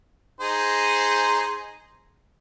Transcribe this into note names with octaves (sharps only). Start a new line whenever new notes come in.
D#4 G#4 C5